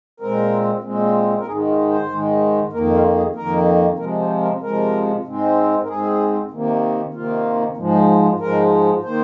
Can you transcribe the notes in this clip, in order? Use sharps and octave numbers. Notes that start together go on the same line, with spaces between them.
A#2 G#3 C4 A#4
A#2 G#3 C4
A#4
G#2 D#3 G#3 G#4
F4
C5
G#2 D#3 G#3
F2 D#3 A#3 A#4
F4
G#4
F2 D#3 A#3 A#4
C3 F3 G#3 A#4
C5
A#4
C3 F3 G#3 A#4
G#2 G#3 C4
A#4
G#2 G#3 C4 G#4
C3 D#3 A#3
C3 D#3 A#3 F4
G#2 F3 G#3
G#2 F3 G#3 A#4
D#3 A#3 C5